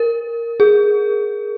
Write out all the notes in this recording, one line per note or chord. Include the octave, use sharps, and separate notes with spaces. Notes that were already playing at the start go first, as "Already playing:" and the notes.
Already playing: A#4
G#4